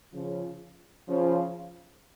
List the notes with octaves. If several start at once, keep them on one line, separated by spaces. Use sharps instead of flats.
C#3 F3
C#3 F3